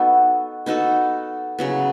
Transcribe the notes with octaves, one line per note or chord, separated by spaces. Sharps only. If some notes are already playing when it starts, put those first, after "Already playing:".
Already playing: B3 D#4 F#4 A4
B3 D#4 F#4 A4
C#3 F#3 B3